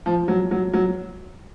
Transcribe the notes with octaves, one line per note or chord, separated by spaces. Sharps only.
F3
F#3
F#3
F#3